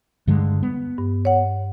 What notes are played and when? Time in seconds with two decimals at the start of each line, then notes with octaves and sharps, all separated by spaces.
0.27 G2 D3 G#3
0.63 B3
0.98 G2
1.25 C#5 F#5